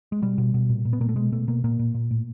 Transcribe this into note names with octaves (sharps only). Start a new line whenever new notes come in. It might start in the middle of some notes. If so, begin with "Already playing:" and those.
G#3
B2 G3
B2
B2
A#2
A#2
B3
A#2 A#3
A3
B2 G#3
B2 A3
B2 A#3
A#2 A#3
A#2
A#2
A2